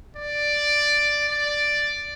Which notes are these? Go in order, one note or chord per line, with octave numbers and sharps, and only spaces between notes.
D5
D5